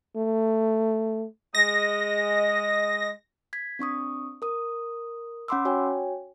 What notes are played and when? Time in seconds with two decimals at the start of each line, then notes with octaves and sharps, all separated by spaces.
0.17 A3
1.55 G#3 D#5 A#6
3.53 G#6 B6
3.79 C4 D4 C#6 D#6
4.42 A#4 D#6
5.48 C#4 F#5 B5 C6 D6 E6
5.65 F#4 C#5 G5 G#5